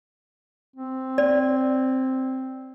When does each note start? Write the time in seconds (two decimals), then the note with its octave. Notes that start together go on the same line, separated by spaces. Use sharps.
0.76 C4
1.18 D5